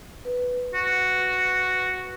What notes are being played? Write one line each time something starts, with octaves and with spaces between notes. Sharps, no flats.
B4
F#4